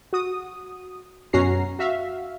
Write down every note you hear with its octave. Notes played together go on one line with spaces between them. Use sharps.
F#4 D#6
F#2 B2 C#4 F#4 A#5 C7
F#4 E5 F5